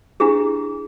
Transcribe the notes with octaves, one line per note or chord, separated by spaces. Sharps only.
D4 E4 G4 G#4